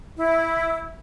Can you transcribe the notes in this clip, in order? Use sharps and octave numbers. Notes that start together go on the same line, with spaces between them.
E4